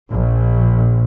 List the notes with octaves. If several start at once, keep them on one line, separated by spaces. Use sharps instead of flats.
A#1